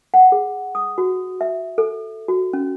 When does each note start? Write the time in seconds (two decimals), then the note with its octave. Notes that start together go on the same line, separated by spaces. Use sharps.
0.14 F#5
0.32 G#4
0.75 D#6
0.98 F#4
1.41 E5
1.78 A4
2.28 F#4
2.53 C#4